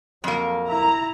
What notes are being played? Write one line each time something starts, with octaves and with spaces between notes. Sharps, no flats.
F2 F#3 A#3
E4 A#5